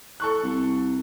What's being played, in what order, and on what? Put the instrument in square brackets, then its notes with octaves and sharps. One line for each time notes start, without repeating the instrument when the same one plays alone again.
[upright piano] A4 C#6 F#6
[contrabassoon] C2